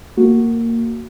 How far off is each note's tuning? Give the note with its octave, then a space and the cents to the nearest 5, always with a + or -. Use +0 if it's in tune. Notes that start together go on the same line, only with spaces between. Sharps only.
A#3 -15 F#4 +0